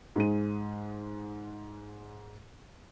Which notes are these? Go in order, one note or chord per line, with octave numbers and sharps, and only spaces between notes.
G#2 G#3 D#7